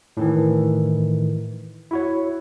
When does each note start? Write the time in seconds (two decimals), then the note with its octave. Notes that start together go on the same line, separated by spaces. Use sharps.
0.17 A2 D#3 E3
1.91 E4 F#4 C#5